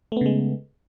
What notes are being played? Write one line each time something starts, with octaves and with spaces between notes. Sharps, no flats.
C#3 G#3 A3 B3